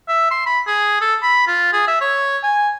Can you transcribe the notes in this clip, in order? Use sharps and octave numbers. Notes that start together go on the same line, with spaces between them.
E5
C6
B5
G#4
A4
B5
F4
G#4
E5
C#5
G#5